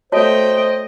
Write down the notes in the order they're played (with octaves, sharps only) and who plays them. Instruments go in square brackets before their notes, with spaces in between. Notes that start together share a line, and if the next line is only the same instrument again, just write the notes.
[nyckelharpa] A3 G5 [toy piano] F#4 C#5 A5 [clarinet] C5 [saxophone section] D#5